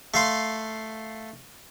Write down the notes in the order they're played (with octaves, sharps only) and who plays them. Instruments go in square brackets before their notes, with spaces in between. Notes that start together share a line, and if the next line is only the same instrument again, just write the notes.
[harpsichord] A3 F5 C6